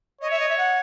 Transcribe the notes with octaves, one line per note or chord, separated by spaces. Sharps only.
C#5 D#5
E5
D#5
E5
F#5